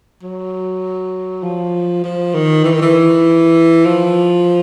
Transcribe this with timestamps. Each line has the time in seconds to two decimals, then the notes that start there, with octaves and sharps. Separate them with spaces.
0.23 F#3
1.43 F3
2.04 F3
2.34 D#3
2.64 E3
2.73 D#3
2.82 E3
3.85 F3